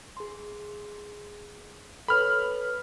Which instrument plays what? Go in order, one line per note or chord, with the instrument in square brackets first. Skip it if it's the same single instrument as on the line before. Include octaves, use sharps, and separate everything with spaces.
[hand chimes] G#4 C6
[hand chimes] A4 B4 C#5 [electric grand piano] B5 F6